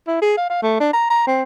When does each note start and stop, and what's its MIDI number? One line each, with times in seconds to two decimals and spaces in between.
0.07 0.20 64
0.22 0.35 68
0.37 0.47 77
0.50 0.62 77
0.62 0.78 57
0.80 0.90 62
0.93 1.06 82
1.10 1.24 82
1.27 1.43 60